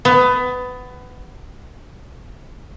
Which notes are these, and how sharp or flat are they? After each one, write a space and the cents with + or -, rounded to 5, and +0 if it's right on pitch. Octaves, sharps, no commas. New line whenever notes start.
B3 +20